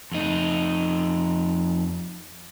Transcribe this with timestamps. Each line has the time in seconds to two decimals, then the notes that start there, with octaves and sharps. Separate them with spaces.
0.12 F2 D#4